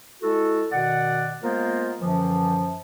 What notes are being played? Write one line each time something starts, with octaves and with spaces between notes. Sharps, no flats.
G#3 E4 F#4 A4
B2 D#3 D5 F#5
G#3 A#3 B3 F4 A#4 C5
F#2 D3 E3 F3